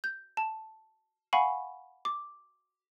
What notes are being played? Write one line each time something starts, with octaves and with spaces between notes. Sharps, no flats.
G6
A5
F5 F#5 G#5 B5 C#6
D6